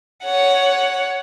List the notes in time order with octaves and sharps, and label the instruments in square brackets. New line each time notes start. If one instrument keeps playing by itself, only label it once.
[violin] C#5 F#5